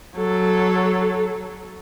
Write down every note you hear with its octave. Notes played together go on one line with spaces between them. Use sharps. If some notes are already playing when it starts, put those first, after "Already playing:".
F#3 A4